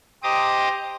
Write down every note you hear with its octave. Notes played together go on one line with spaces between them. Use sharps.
G4 C5 D#5 A#5 D6 D#6